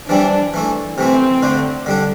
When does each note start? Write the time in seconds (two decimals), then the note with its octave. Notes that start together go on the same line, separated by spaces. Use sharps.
0.09 E3 G3 C4 D4 E4
0.54 E3 A3 E4
0.98 C3 E3 A3 C4 E4
1.42 D3 A3 D4
1.86 D3 G3 D4